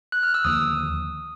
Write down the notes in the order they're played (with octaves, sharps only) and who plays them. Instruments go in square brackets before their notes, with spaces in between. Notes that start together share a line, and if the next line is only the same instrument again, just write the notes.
[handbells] F#6
F6
E6
[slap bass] D#2 D3 F3 A#3 [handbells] D#6